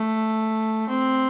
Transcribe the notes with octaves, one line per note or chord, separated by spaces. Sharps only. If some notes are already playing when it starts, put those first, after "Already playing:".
Already playing: A3
C4